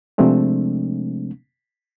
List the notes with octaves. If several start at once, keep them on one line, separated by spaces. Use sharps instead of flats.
C3 F3 G#3 A3 C4 D4